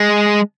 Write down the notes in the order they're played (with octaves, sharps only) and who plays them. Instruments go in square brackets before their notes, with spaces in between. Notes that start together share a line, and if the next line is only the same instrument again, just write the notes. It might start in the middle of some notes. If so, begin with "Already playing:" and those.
Already playing: [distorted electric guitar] G#3